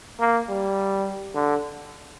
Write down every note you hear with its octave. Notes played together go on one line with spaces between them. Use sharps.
A#3
G3
D3